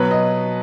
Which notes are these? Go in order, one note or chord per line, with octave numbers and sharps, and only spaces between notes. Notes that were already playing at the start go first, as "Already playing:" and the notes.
Already playing: B2 F#3 B4
D#5